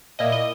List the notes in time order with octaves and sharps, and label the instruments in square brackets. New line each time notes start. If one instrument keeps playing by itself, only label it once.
[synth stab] A#2 A#3 E4 D#5
D#5